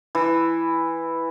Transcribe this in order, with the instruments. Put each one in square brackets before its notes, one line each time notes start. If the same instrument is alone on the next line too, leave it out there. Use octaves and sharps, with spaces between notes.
[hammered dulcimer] E3